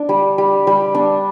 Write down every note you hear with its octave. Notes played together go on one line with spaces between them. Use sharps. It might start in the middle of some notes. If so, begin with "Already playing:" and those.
Already playing: D4
G3
G3
G3
D4